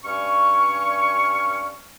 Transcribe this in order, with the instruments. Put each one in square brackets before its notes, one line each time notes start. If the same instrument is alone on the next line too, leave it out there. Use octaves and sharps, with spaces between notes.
[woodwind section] G2 C#4 C#6